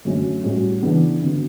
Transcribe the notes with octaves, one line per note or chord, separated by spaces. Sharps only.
F#2 D3 F#3 A3 C#4
A2 G3 C#4 F#4
C#3 E3 B3 D4
D3 F#3 B3